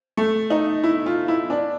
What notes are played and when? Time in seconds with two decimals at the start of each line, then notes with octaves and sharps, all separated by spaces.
0.17 A3
0.50 D#4
0.84 E4
1.06 F4
1.28 E4
1.50 D4